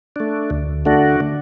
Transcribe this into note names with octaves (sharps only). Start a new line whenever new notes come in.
A3 D4
D2
D3 A3 D4 F#4
D3